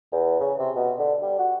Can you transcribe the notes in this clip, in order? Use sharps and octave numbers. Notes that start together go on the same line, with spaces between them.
E2
C#3
C3
B2
D3
G3
F#4